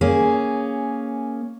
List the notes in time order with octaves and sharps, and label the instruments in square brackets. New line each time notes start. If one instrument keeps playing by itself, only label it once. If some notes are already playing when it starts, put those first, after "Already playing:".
[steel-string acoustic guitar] A#3 C#4 G#4